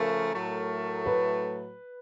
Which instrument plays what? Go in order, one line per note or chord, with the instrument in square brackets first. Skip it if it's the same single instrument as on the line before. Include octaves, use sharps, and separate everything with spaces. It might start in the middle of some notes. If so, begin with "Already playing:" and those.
Already playing: [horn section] C#3 F3 A3 [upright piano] A#4
[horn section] A2 F#3 A3
[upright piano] B4